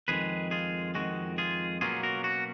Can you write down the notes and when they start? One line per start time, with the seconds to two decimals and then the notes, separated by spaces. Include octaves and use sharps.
0.08 F2 D#3 G#3 G#4 B4
0.51 F4 G#4
0.95 F2 D#3 G#3 F#4
1.38 F4 G#4
1.81 B2 F#3 A#3 C#4 F4 G#4
2.03 F#4 A#4
2.24 F#4